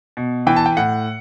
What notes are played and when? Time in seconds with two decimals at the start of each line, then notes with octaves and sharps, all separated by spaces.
0.17 B2
0.47 E3 G5
0.56 A5
0.66 G5
0.77 A2 F#5